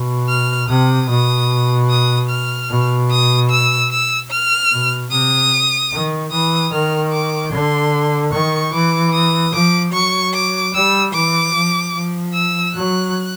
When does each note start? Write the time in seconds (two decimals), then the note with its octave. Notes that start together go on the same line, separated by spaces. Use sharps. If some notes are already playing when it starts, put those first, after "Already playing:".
Already playing: B2
0.29 F6
0.69 C3 D#6
1.09 B2 D#6
1.90 D#6
2.29 F6
2.70 B2
3.11 D#6
3.50 E6
3.91 E6
4.31 F6
4.71 B2
5.11 C3 D#6
5.92 D#3
6.31 E3 D#6
6.72 D#3 F6
7.12 D6
7.52 D3 C6
8.33 D#3 C#6
8.73 E3 D6
9.13 D#6
9.54 F3 D6
9.93 F#3 C#6
10.34 D6
10.74 G3 E6
11.14 E3 D6
11.54 F3
11.94 F3
12.34 E6
12.75 F#3 F#6